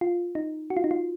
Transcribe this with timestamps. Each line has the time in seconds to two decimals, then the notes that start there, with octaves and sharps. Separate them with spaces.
0.01 F4
0.35 D#4
0.70 F#4
0.77 F4
0.84 D#4
0.91 F4